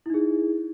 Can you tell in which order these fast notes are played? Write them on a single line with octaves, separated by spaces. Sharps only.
E4 D#4 G#4